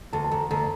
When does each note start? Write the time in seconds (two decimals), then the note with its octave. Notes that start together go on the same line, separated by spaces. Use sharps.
0.13 D2 A5
0.24 A5
0.31 D2 A#5
0.51 D2 A#5